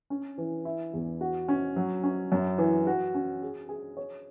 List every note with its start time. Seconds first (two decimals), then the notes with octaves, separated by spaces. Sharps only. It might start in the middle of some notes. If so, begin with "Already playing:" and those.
0.10 C#4
0.38 E3
0.65 E4
0.93 E2
1.21 F#4
1.48 C#4
1.76 F#3
2.03 C#4
2.32 F#2
2.58 E3
2.87 F#4
3.14 C#4
3.42 G#4
3.69 G#4
3.97 C#5